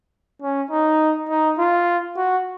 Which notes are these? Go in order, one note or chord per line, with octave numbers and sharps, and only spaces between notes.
C#4
D#4
D#4
F4
F#4